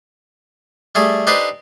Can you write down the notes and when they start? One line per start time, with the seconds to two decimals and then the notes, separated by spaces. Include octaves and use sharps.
0.95 G3 A3 G#4 A4
1.27 D4 D#4 G4 A4 B4 C5